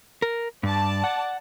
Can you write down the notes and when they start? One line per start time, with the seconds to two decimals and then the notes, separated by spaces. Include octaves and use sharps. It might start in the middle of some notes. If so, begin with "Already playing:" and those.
0.22 A#4
0.63 G2 D5 A5
1.04 F#5